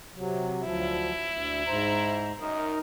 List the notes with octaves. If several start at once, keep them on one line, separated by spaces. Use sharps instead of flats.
C3 F#3
D2 F3 F#3 E4
D2
G#2 C5 A#5
F#2 D#4 A#4 D#5